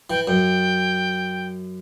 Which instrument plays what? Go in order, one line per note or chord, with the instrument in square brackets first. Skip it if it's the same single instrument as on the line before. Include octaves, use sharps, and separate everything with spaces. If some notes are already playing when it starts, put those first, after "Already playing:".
[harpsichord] E3 [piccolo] G5
[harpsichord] F#2 [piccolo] G5